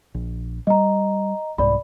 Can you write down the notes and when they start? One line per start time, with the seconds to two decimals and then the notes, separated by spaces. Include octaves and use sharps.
0.14 A#1
0.67 G3 D#5 A#5
1.58 C2 G#2 D5 B5